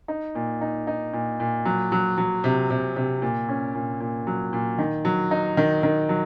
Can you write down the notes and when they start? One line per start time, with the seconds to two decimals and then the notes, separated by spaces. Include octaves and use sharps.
0.08 D#4
0.35 A#2
0.61 D#4
0.87 D#4
1.13 A#2
1.40 A#2
1.65 F#3
1.92 F#3
2.18 F#3
2.44 C3
2.70 C3
2.96 C3
3.22 A#2
3.49 C#4
3.75 A#2
4.00 A#2
4.27 F#3
4.53 A#2
4.78 D#3
5.05 F#3
5.31 D#4
5.57 D#3
5.83 D#3
6.09 F#3